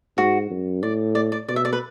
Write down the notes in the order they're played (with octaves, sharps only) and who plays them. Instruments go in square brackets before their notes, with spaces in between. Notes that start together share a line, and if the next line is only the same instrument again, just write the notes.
[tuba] G#2 [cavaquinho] F#4
[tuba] F#2
[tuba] A2 [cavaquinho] D5
[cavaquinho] D5
D5
[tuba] B2 [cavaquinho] D5
[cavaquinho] E5
D5
B4